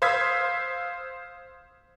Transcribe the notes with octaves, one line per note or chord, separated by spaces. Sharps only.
C5 F5 D#6 E6 G#6 B6